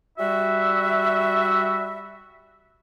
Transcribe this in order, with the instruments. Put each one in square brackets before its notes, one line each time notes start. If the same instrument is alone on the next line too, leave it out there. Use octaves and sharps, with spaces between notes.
[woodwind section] G3 F#4 E5